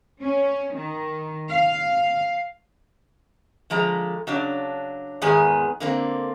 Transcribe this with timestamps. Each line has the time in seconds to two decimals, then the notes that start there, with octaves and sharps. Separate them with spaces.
0.21 C#4
0.74 D#3
1.48 F5
3.70 D3 F3 G#3 A#5
4.27 C#3 F#3 D4
5.22 E2 G#2 D#3 B3 G#4 G#5
5.80 D3 A#3 C4